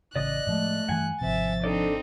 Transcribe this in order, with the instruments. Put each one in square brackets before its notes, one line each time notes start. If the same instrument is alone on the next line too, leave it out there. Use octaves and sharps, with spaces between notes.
[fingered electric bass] A1 C#3 [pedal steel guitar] D5 D#5 D#6 [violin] F#6
[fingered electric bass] A2 F3 G#3 [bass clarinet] A3
[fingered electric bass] G2 E3 [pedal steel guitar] F#5 G#5
[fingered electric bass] G#1 C3 [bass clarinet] F3 [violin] E5 A6
[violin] C4 D#4 [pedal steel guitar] D4 A4 D5